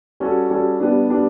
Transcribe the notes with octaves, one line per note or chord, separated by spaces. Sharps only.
G3 C#4 F#4 A4
G3 C#4 F#4 A4
G3 B3 D4
G3 B3 D4